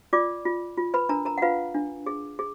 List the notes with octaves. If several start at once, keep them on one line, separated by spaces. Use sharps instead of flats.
F4 D5 D6
F4
F4
B4 B5
D4 A#4 A#5
A#4 A#5
F#5
F4 B4 F5
D4
G#4
G#4